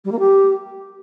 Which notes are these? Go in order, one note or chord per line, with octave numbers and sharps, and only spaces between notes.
G3
A#3
G4